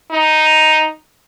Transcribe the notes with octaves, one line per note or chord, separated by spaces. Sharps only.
D#4